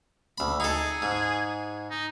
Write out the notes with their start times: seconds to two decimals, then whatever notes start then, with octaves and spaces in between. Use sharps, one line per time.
0.38 D2 B5
0.60 D#4 G#4 A4
1.02 G#2
1.91 D#4